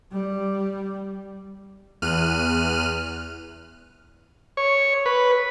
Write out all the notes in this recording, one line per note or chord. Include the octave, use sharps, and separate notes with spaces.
G3
E2 F6 F#6 D#7
C#5
B4